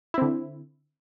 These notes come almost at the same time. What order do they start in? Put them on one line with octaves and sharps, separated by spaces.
E4 C4 D3